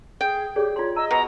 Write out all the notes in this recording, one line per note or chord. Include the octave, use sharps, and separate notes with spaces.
G#4 G5
G4 G#4 C#5 D5
F4 C#5 C6
D#5 A#5 E6
B2 B4 A#5